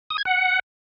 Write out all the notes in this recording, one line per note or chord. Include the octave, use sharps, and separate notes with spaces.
D#6
G#6
F#5